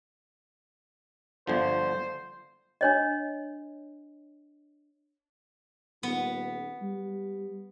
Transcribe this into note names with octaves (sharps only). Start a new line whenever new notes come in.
G1 D3 F3 C5
D4 C#5 D#5
D#1 B3
G3